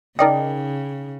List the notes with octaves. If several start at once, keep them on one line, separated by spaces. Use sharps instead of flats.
C#3 D#4 A#4 D5 D#5 G5